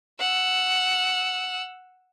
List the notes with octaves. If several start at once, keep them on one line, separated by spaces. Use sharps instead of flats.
F#5 E6